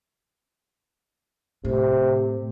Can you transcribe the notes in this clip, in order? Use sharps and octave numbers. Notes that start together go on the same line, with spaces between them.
A2 C3